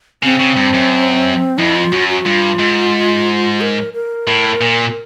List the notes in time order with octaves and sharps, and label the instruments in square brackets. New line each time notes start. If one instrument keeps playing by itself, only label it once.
[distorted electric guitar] C#3 [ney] C4
[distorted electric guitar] C#3
G2
F#2
[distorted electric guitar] F2 [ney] E4
[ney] F4
[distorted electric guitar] F#2 [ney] F#4
[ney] F#4
[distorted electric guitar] G2 [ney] F4
[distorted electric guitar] G#2
[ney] A#4
A#4
[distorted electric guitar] A2
A#2